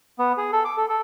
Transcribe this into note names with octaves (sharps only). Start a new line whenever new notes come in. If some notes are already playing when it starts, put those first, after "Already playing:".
B3
G#4
A4
D6
A4
A4